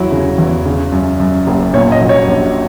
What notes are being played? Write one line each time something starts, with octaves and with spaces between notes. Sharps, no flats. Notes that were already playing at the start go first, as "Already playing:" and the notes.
Already playing: E2 F#3 E4
C#3
E2
C#3
F#2
F#2
F#1
A#2 C#5
D#5
F#3
C#5
A#1